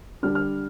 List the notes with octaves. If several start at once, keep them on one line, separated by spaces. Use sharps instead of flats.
D3 G3 D4 F6
F6